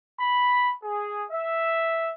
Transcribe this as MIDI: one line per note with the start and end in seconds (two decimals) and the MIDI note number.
0.20 0.72 83
0.83 1.23 68
1.31 2.09 76